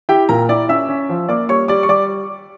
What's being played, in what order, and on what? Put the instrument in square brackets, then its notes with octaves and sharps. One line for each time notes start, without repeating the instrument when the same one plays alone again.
[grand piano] E4 G4 G5
A#2 A#4 A#5
E4 D5 D6
C#4 E5 E6
C#4
F3
A#3 D5 D6
G3 C#5 C#6
G3 D5 D6
C#6
G3 D5 D6